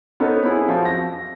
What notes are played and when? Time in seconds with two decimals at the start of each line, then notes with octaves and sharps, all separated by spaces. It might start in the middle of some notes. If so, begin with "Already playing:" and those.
0.20 B3 C4 D#4 A4 A#4 C#5
0.43 B3 E4 G#4
0.68 F3 C4 F#4
0.85 A#6